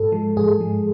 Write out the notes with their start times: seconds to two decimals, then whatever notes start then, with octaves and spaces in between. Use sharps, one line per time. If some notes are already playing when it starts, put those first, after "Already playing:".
Already playing: G#2 A4
0.12 F3 G#3
0.37 G#2 G#4
0.61 F3 G#3